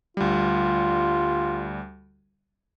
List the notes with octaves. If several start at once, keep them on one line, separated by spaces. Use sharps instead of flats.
D2 G3 F4